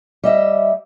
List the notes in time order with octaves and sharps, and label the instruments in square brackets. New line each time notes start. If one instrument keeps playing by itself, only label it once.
[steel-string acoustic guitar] G3 D#5 E5